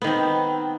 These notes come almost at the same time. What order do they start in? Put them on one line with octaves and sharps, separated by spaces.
B3 D#3 C4